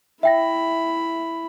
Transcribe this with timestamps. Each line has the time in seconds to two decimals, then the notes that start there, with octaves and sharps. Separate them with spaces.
0.23 E4 E5 G5 B5 A#6